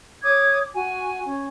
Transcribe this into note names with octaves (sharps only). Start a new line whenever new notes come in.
C#5 D6 D#6 G#6
F#4 G#5
C#4